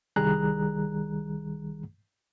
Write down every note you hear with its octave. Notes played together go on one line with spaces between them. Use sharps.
C2 D#3 G3 G#4 A#5 F#6